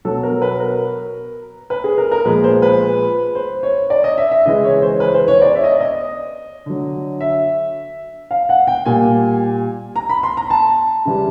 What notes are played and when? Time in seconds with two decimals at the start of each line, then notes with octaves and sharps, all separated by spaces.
0.05 B2 F#3 A4
0.23 A#4
0.42 B4
0.60 A#4
1.70 B4
1.84 G#4
1.98 A#4
2.12 A#4
2.25 A#2 F3 G#3 B4
2.44 C5
2.62 B4
3.35 C5
3.63 C#5
3.90 D5
4.04 D#5
4.18 E5
4.31 E5
4.45 C#3 E3 G#3 D#5
4.64 C#5
4.82 C5
5.00 B4
5.14 C5
5.28 C#5
5.42 D5
5.55 E5
5.64 D#5
5.72 D5
5.81 D#5
6.66 D3 F#3
7.21 E5
8.31 F5
8.49 F#5
8.67 G5
8.86 A#2 G3 G#5
9.96 A#5
10.09 B5
10.23 C6
10.37 A#5
10.50 A5
11.05 C#3 E3 G3